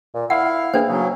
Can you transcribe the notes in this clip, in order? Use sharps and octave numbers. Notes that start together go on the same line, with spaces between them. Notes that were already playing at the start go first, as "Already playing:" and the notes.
A#2
E4 F5 F#5
A#3 D4 G#4 B4 C5
C#3 F#3